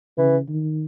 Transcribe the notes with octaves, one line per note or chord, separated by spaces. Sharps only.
C#3 E3
D#3